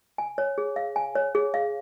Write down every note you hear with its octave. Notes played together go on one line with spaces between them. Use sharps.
G#5
C#5
G#4
F5
G#5
C#5
G#4
F5